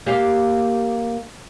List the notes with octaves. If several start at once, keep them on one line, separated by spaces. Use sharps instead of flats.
A#3 G4 F5